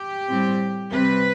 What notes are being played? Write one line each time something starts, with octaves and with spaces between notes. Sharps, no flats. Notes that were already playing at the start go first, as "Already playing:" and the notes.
Already playing: G4
A2 G3 C4
C3 G3 C4 B4